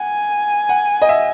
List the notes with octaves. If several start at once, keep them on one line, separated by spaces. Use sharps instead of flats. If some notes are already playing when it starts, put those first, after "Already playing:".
Already playing: F#5 G#5
F#5
D#5
E5